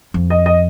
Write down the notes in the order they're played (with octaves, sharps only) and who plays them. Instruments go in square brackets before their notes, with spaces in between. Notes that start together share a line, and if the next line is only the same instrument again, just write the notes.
[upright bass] F2
[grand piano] D#5
D#5